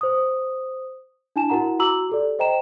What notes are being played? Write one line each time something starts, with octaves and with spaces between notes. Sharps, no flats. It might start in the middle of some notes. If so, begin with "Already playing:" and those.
C5 D#6
D4 E4 G#5 A5 E7
E4 F#4 A#4 F#5 A#5
F#4 A#5 D6 E6 F#7
G4 A4 D5
C5 D#5 G5 A#5 E7